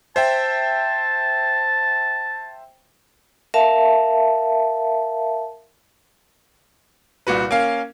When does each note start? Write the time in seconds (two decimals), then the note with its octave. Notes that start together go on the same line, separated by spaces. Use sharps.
0.16 C5 E5 G5 A5
3.54 A#4 E5 F5 A5
7.27 C2 A#2 F#4 B4
7.51 A#3 C#4 F5